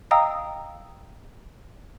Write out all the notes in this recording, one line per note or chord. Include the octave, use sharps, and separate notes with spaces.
D#5 F5 G5 A#5 D#6 E6